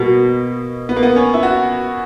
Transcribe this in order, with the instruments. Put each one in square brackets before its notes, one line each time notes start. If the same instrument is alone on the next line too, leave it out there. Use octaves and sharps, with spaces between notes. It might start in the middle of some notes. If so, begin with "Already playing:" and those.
Already playing: [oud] B2 [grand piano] A#3
[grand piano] B3
A#3
B3
C#4
E4
F#4